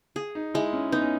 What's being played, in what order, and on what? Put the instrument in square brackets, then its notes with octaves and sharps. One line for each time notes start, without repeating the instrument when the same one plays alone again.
[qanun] G#4
[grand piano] D#4
[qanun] G#3 [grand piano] E4
[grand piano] C#4
[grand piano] B3 [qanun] D#4
[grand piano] C#4